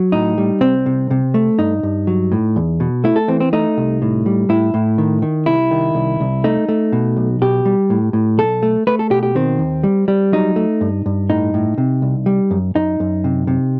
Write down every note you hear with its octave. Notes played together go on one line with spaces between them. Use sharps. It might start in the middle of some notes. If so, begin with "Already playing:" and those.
Already playing: F#3
A2 D#4
G3
C2 C4
C3
C3
A3
G2 D#4
G2
F#3
A2
E2
B2
A3 E4
A4
E3 C4
C4
A3 D#4
C2
A2
G3
A2 E4
A2
D#3
D#3
C2 E4
D#3
C2
C2
A3 D#4
A3
B2
B1
B2 G4
G3
A2
A2
B1 A4
A3
A3 B4
A4
B2 G4
G4
D#3 C4
D#2
G3
G3
F#3 D#4
A3
G2
G2
A2 D#4
A2
C3
C2
G3
F#2
F#2 D#4
F#2
C3
C3